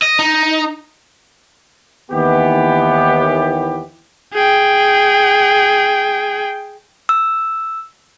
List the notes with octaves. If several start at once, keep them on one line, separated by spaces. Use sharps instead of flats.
D#5
D#4
D#2 E3 B3 G4
G#4 G5
E6